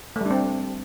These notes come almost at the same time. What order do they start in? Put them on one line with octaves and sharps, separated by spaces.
A3 G3 D4 C4